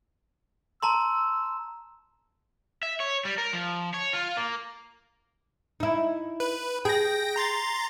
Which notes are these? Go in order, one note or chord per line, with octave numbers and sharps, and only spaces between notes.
A5 A#5 C6 E6
E5
C#5
G3
A#4
F3
C#5
F4
A#3
D#4 E4
B4
G#4 G5 A#6
A#5 C6 A6